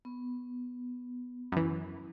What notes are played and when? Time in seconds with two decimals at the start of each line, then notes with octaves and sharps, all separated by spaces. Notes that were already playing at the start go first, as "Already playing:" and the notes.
0.05 B3
1.52 F#2 E3